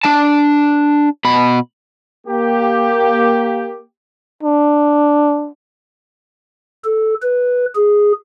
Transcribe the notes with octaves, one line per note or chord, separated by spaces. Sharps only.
D4 A5
B2 B5
A#3 G4
D4
A4
B4
G#4